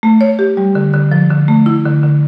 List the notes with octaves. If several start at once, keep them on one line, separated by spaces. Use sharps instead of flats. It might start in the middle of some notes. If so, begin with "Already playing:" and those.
A3
C#5
G4
G3
D3
D3
F3
D3
A3
E4
D3
D3